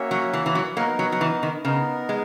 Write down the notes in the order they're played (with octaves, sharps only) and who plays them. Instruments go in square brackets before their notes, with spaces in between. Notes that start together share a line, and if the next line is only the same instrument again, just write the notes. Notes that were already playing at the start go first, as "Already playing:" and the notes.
Already playing: [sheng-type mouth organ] A#3 C#4 F#4 C#5 E5
[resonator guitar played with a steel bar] F#3
E3
E3
F#3
[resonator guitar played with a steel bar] F#3 A#3 [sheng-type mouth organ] B3 D#4 A#4
[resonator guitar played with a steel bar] F#3
F#3
E3
D#3
[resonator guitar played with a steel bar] C#3 [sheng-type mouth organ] B3 D#4 A#4
[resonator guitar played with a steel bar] G#3